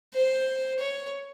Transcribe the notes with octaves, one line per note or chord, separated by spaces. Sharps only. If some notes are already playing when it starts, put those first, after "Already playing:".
C5
C#5